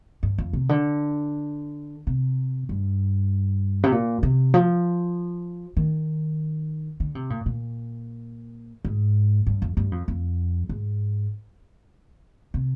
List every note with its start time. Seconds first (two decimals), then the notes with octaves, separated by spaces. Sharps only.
0.23 G2
0.38 F2
0.53 C3
0.69 D3
2.07 C3
2.69 G2
3.83 C3
3.92 A#2
4.23 C3
4.54 F3
5.77 D#3
7.00 D3
7.15 C3
7.30 A#2
7.46 A#2
8.85 G#2
9.47 G2
9.62 F2
9.77 G2
9.92 F2
10.08 F2
10.69 G#2
12.54 C3